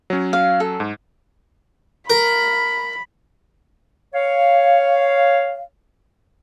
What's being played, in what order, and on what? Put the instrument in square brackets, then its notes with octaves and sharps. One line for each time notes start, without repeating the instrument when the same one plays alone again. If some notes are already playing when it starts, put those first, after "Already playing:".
[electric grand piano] F#3 C#4
[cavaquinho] F5
A4
[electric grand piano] G#2
[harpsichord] A#4 [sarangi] B5
[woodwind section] C#5 F5